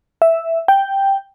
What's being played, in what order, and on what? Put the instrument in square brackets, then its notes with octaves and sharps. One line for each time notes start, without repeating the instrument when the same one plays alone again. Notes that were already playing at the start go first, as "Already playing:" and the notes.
[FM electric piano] E5
G5